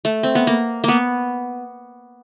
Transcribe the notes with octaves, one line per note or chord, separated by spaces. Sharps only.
A3
C4
B3
A#3
A#3 B3